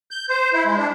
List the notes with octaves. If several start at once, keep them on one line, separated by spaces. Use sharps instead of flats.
G6
C5
E4
G#3
D4